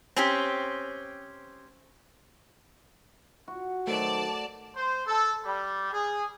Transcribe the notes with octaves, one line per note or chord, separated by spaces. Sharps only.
C4 C#4 G4
F#4
D#3 F#3 A3 C5 D5 A5
C5
A4
G3
G#4